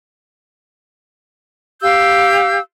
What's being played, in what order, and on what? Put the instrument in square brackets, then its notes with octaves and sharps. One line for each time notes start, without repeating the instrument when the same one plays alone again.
[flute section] G4 F5 E6 G6